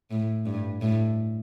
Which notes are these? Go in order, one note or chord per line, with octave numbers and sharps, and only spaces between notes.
A2
G2
A2